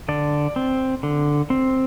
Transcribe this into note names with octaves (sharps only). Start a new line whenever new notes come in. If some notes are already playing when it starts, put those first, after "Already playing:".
D3 D5
C4
D3
C4